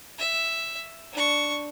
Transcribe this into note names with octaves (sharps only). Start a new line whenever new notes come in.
E5
D4 C#6